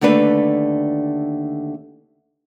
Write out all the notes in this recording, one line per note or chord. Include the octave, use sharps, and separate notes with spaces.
D#2 D3 A3 D4 B4